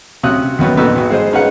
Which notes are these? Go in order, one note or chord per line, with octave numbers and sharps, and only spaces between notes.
C3 C#4 F#4 F5 D#6 F#6
D#2 F#3 B3 C#4
F2 A#2 B3 D#4 F#4 E6
G#1 F#4 B4
G#3 C5 D#5
C#4 D#4 G#4 B4 F#5